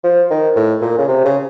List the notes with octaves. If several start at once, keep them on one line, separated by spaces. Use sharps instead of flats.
F3
D#3
A2
A#2
C#3
C3
C#3